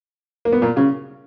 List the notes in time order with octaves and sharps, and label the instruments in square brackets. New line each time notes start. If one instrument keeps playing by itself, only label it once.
[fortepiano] A#3
B3
A#2 A#3
C#3 C#4